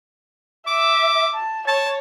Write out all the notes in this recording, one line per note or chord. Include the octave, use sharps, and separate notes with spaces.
E5 D6
A5
C#5 A5